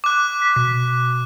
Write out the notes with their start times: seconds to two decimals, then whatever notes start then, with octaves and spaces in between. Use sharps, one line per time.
0.04 D6 F#6
0.41 B6
0.56 B2